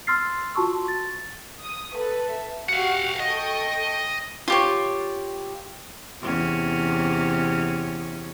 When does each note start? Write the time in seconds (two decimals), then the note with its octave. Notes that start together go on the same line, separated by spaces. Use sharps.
0.07 C6 E6 F6 A6 C7
0.55 F4 F#4 A5 C6 C#6 E6
0.88 A6
1.63 D#6
1.97 A4 B4
2.33 E5
2.69 F#4 G4 F5 F#5
3.20 A4 D#5 G5 C#6
4.48 F4 G4 C#5
6.21 E2 C3 C#4